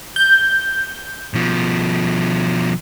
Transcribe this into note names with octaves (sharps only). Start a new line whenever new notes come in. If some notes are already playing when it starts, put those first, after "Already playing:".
G6
B2 F3